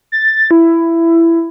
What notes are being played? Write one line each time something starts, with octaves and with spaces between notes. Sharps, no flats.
A6
E4